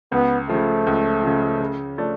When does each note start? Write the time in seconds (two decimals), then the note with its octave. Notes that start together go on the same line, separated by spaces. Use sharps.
0.12 C#2 B3
0.49 C#3 F3 A3
0.87 C#2
1.23 C#3 F3
1.60 C#3
1.98 F3 A3 D4